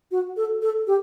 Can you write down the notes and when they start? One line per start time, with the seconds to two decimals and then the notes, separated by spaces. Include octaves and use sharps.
0.11 F#4
0.37 A4
0.62 A4
0.87 G4